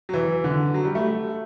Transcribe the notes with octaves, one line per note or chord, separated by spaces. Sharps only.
F#3
E3
D3
F#3
G3
A3